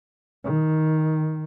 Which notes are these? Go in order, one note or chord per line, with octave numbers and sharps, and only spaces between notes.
D#3